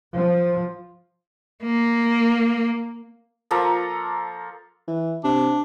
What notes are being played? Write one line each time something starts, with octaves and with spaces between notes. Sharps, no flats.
F3
A#3
F3 A#3 A4 A#5
E3
C3 D4